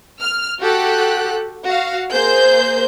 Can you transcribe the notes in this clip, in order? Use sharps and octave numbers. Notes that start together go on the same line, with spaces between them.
F6
F#4 G4 A4 F#6
F#4 F5
A#3 G#4 C5 G6